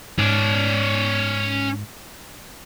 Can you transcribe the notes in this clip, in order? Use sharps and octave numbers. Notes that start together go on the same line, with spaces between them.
G#2 C#4 D5